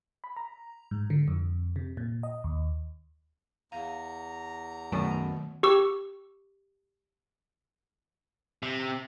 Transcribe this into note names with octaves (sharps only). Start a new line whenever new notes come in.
B5
A#5
G#2
D3
F2
C3
A#2
D#5
D#2
E2 F5 A#5
B1 F#2 B2 D#3 A3 C#6
G4 C#6 E6
C3